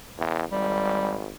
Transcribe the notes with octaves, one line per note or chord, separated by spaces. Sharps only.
E2
G#1 G3